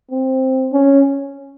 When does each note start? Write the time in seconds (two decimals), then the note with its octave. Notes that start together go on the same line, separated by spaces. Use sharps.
0.11 C4
0.73 C#4